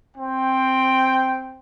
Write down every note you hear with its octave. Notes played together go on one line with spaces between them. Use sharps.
C4 G5